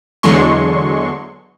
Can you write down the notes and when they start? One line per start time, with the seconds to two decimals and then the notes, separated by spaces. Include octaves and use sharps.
0.23 E2 D3 F#3 G#3 C6 C#6